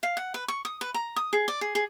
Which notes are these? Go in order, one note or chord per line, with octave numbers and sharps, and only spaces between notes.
F5
F#5
B4
C#6
D#6
B4
A#5
D#6
G#4
D5
G#4
G#4